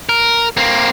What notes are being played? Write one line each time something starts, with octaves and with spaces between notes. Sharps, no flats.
A#4
A#3 C4